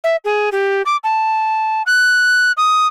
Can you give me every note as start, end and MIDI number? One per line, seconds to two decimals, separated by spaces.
0.04 0.16 76
0.25 0.49 68
0.52 0.82 67
0.86 0.96 86
1.04 1.82 81
1.86 2.52 90
2.57 2.87 87